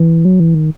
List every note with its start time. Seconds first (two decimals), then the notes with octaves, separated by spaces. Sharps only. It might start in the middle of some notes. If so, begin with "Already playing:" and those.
Already playing: E3
0.25 F#3
0.40 E3
0.55 D#3